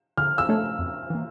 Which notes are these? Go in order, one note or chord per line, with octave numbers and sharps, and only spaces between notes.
D3 F6
E6
A3 D4 A4 C#5
F2
E3 A#3